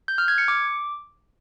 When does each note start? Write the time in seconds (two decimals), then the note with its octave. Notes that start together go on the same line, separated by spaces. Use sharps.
0.08 G6
0.18 F6
0.28 G#6
0.38 C#7
0.48 D6